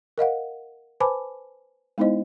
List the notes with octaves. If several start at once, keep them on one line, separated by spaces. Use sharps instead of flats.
A#4 D#5 F5 F#5
B4 C5 G#5 A5 B5 D6
G#3 B3 D#4 E4 C5 D#5